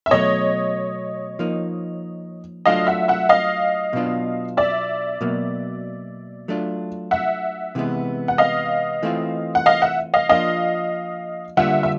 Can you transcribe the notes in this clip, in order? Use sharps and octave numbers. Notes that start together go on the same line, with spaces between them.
E5
B2 F#3 A3 C#5 D#5
F3 A#3 D#4
F#3 A3 D4 F4 D#5 F5
E5 F#5
E5 F#5
D#5 F5
B2 F#3 B3 D4 F4
D5 E5
B2 F#3 A#3
F#3 A3 D4 F4
E5 F#5
C3 E3 G#3 B3
F#5
D#5 F5
E3 A3 C4 F4
F#5
D#5 F5
E5 F#5
D#5 F5
F3 A#3 D4 F4 D#5 F5
D3 G3 A#3 D4 F4 E5 F#5
E5